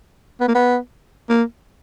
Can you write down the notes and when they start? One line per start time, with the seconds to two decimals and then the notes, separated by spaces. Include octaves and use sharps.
0.41 B3
0.48 A#3
0.55 B3
1.29 A#3